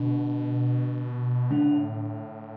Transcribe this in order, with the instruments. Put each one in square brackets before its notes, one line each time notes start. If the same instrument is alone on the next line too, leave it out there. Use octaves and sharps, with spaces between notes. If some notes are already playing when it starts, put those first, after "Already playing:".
Already playing: [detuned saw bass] B2 [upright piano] D3
[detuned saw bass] A2 [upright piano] D3